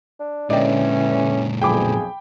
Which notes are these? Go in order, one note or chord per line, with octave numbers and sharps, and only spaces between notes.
D4
A#2 D3 E3 G#3 C#4 D5 D#5 G5
B1 F2 G#4 G5 B5 D6